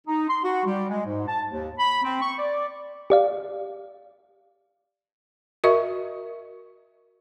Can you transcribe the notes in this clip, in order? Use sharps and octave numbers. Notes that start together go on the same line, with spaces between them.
D#4
C6
F#4
G3
G#3
G#2
A5
D#2
B5
C4
C#6
D5
G4 D5 F5
F#4 A#4 D#5 E5 C#6